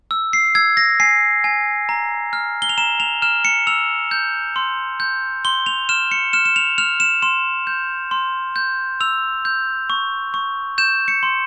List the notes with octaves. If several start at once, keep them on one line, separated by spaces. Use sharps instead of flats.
E6
C7
E6 G#6
A#6
G#5 C7
G#5
A#5
F6
G7
F7
A#5 E7
F7
F6 E7
C#7
E6 F7
G6
C6
G6
C6 G7
F7
F6 E7
C#7
F6 E7
E7
F7
F6 F7
E7
C6 E7
G6
C6
G6
E6 F7
G6
C#6
C#6
G6 E7
C#7
C6